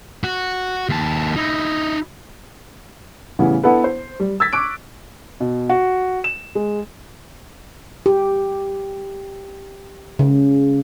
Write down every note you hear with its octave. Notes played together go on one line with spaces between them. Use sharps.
F#4
D#2 A5
D#4 E4
A2 C#3 E3 G3 B3
B3 D4 E4 A4 B4
C5
G3
E6 G#6 A6 B6
C#6 D6 F#6 D7
B2
F#4
E7
G#3
G4
C#3